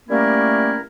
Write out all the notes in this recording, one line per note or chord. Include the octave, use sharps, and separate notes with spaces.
G3 A3 A#3 C#4 E4 A#4